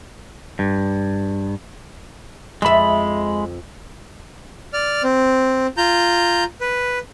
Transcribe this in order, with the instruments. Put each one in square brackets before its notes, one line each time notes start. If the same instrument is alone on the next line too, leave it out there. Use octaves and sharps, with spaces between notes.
[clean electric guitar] G2
[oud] F2 E5 [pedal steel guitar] G#3 B5
[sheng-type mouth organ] D5 F6
C4
F4 A#5 G6
B4